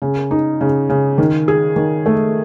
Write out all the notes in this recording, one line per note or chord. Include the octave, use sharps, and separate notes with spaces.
C#3
D#4
C#3
C#3
D#3
G#4
D#3
A3